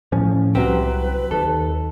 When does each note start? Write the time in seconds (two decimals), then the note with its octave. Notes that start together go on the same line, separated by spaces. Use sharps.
0.12 A2 F3 C#4
0.55 C2 F#3 C4 G4 B4
1.31 D#2 A4